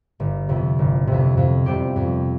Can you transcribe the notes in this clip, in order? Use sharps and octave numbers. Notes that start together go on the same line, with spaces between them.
G1
F2 C3
G1
F2 C3
F2
C3 G3 C4 G4
F2